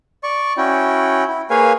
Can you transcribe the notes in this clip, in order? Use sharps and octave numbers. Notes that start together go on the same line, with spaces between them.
D5 C#6
C#4 E4 F#4 G5
E4
A#3 G#4 B4 C#5 F5 G#5